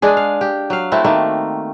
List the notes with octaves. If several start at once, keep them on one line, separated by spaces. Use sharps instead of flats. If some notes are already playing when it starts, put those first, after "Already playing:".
G#3 D4 G#4
F5
G4
F#3 F5
A3 C4 E4 F#4
D#3 A3 A#3